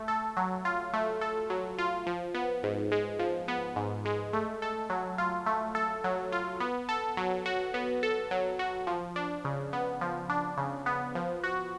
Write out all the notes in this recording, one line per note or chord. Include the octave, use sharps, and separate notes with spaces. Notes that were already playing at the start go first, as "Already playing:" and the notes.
Already playing: A3
A4
F#3
F4
A3
A4
F#3
F4
F3
B3
G#2
G#3
F3
B3
G#2
G#3
A3
A4
F#3
F4
A3
A4
F#3
F4
B3
A4
F#3
F#4
B3
A4
F#3
F#4
F3
D4
C#3
B3
F3
D4
C#3
B3
F3
F#4